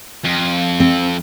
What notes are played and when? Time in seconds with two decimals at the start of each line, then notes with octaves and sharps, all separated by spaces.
0.24 F2
0.80 C4